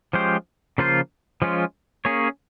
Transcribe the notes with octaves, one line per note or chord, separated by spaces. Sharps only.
F3 G#3 C#4 G4 C5
C#3 F3 A#3 F4 C5
F3 G#3 C#4 F4
A#3 C#4 G#4 C#5